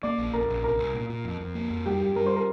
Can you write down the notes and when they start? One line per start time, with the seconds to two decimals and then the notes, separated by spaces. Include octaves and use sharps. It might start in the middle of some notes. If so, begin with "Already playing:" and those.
0.03 A#3 D5 D6
0.18 A#1
0.33 A#1 A#4 A#5
0.48 A#1
0.63 C2 A#4 A#5
0.79 C2
0.94 A#2
1.10 A#2
1.25 F2
1.41 F2
1.55 A#3
1.70 F2
1.86 G3 G4 G5
2.01 G2 G4 G5
2.16 G3 A#4 A#5
2.26 C5 C6
2.36 A#4 A#5